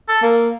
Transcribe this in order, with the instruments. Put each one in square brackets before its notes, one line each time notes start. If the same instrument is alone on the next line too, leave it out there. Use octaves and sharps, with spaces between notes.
[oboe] A4
[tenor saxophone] A#3